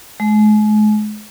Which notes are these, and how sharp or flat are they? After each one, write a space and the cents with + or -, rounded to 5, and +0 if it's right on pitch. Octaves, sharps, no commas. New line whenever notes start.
G#3 +40